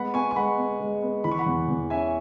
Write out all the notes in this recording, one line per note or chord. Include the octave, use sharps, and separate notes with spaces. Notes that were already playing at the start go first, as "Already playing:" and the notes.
Already playing: G#3 B3 F#5 B5
B3 G#5 C#6
C#6
G#3 F#5 B5
B3
G#3
B3
E3 B5
C#6
F#5 B5
E2
E2
C#4 E5 G#5